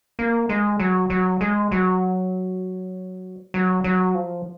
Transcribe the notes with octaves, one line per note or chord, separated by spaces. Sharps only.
A#3
G#3
F#3
F#3
G#3
F#3
F#3
F#3
F3